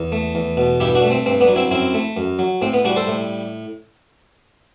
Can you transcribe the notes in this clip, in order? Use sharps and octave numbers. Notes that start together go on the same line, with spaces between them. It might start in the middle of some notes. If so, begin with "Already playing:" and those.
Already playing: E2
A3
E2
B2
G2 E4 G4
D4 F#4
A3
C4
G2 C4
B3 D4
F#3
C4 E4
F#2 C4 E4
A3
F#2
F#3
A2 C4
B3
G3 D4 F#4
A4 C5
A2